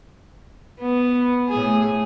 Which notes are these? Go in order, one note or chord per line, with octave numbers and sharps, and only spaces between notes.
B3
A2 G#4